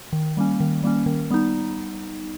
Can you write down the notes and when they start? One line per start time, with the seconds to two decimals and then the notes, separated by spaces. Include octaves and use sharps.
0.13 D#3
0.37 G3 A#3 C#4
0.60 D#3
0.83 G3 A#3 C#4
1.06 D#3
1.30 G3 B3 D#4